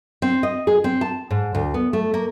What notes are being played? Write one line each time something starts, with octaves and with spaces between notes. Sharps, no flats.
C4
D#5
G#4
C4
A5
G#2
D2
B3
A3
A#3